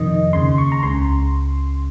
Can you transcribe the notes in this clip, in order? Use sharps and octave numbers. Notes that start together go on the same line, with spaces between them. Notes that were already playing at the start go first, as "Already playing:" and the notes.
Already playing: F2 C3 D#3 D#5
D#2 C#3 C6
C#6
A#5
C#2 C#3 C6